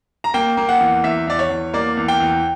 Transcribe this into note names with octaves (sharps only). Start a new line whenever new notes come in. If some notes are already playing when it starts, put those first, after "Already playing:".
A#5
A#3 G5
A#3
F#5
E2
E2 E5
E2 D5
C#5
E2
A#3 D5
E2
G5
E2